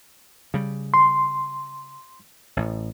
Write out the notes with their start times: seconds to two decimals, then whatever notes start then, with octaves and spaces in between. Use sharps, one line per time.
0.54 C#3 G3
0.94 C6
2.57 A1 A2